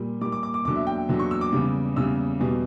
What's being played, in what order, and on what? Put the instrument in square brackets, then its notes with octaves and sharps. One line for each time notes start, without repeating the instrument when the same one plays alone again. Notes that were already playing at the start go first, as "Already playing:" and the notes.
Already playing: [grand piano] A#2 G3
G3 D6
A#2
D6
D6
D6
E2 D3 F#3 D6
E5
G5
E2 D3 F#3
C#6
E6
D6
E2 C#3 G3
E2 C#3 G3 E6
E2 B2 G3